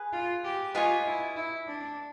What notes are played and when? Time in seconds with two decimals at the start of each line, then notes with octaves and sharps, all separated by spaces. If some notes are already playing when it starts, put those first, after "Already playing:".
Already playing: G#4 B4
0.12 F4
0.44 G4
0.74 F4 B4 D#5 G#5 C#6
1.06 E4
1.36 E4
1.67 D4